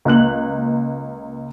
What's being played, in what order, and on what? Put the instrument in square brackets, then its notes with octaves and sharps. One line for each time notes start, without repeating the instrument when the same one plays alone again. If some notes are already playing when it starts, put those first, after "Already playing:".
[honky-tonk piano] C#2 A#3 F#6 F#7